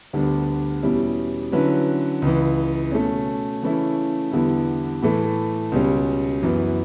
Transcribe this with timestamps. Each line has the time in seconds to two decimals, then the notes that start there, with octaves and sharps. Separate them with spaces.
0.13 D2 D3 G3 B3 D4
0.82 E2 B2 G3 C#4 E4
1.52 D3 F#3 C#4 E4 B4
2.22 C#2 C#3 E3
2.92 B2 A3 C#4
3.62 C#3 E3 A3 C#4 E4
4.32 E2 D3 G3 B3 E4
5.02 A2 E3 A3
5.72 C#2 B2 G3 C#4
6.43 F#2 E3 B3